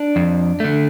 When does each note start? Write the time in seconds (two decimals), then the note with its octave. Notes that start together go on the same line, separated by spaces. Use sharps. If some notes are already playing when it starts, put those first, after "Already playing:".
Already playing: D4
0.16 F2
0.60 D3 A3